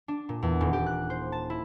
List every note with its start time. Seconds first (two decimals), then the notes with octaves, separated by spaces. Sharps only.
0.08 D4
0.29 A#2
0.42 E2
0.61 D#1
0.73 G4
0.86 F#6
1.10 C5
1.32 A5
1.50 E4